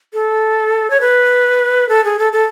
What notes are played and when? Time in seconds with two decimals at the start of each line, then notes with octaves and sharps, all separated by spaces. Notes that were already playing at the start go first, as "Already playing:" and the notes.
0.13 A4
0.90 C#5
1.01 B4
1.89 A4
2.04 G#4
2.19 A4
2.33 A4